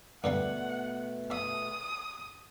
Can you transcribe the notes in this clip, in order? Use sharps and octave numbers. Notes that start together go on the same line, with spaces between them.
G2 B2 D3 G3 A3 B3 F#5
E5 D#6